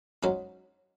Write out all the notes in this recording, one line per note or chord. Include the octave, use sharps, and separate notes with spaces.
G#2 F#3 C#4 D#4